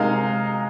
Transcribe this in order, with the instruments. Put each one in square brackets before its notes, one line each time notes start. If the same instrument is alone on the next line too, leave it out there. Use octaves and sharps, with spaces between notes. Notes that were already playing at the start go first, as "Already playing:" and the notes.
Already playing: [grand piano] C3 G#3 D#4 A#4 [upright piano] F5